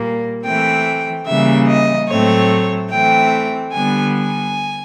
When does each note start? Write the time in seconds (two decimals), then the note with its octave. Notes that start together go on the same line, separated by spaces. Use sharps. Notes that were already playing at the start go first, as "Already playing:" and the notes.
Already playing: A#2 G3 A#3
0.45 E3 A3 C4 G5
1.27 C#3 E3 G3 A#3 E5
1.68 D#5
2.09 A2 F#3 A3 C4 C#5
2.91 E3 A3 C4 G5
3.73 D3 G3 B3 G#5
4.14 G#5